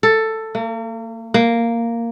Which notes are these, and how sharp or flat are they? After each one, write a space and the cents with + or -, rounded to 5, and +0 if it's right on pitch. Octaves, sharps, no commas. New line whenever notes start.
A4 +10
A#3 -40
A#3 -5